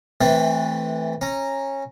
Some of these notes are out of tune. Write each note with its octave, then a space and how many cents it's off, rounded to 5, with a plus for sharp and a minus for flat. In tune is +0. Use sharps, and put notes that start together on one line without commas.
E3 -15 A3 +0 C4 +0
C#4 -20 A#5 +0